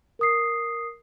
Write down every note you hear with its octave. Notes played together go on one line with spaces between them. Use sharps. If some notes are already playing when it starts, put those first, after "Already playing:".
A#4 D#6 C7